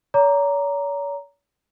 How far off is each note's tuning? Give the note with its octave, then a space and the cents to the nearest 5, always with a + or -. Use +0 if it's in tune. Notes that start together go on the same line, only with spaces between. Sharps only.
C#5 +45 A#5 +0 D6 +0